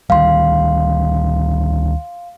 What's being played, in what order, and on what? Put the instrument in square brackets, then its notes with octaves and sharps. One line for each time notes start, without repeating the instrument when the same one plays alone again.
[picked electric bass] D2 D#3 G3 [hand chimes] F5 C6